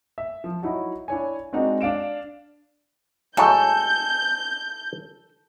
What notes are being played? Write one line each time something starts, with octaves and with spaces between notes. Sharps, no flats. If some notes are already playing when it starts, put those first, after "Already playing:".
E5
F3
F#3 D#4 E4 F#4
D4 E4 C#5 G#5
G#3 C4 D4 D#4 F#4 A#4
D4 F5 D7 E7
A2 F#3 G#3 A4 G#5 G6